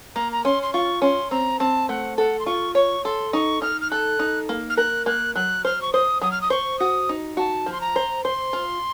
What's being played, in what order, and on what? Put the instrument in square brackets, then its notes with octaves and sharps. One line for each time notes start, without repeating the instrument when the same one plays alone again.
[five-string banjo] A#3 [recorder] A#5
[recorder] A#5
[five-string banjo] C#4 [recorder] C6
[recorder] C6
[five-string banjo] F4 [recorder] C#6
[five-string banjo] C#4 [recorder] C6
[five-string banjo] C4 [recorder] A#5
[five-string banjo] C4 [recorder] A5
[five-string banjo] A3 [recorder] F#5
[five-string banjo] A4 [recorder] F#5
[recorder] C6
[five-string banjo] F4 [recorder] C#6
[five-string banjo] C#5 [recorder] C#6
[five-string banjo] A4 [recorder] C6
[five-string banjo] D#4 [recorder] C#6
[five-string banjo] D#4 [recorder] F6
[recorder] F6
[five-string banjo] A4 [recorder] F#6
[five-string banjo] D#4
A#3
[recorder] F6
[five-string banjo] A#4 [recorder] F#6
[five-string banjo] A#3 [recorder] F#6
[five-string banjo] F#3 [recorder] F#6
[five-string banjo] C5 [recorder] F6
[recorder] C#6
[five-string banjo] C5 [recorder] D#6
[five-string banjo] F#3 [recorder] D#6
[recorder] F6
D#6
[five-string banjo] C5 [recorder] C#6
[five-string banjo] F#4 [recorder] D#6
[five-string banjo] D#4
[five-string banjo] F#4 [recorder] A5
[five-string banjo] F3
[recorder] C6
A#5
[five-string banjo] C5
[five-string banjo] C5 [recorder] C6
[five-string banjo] F4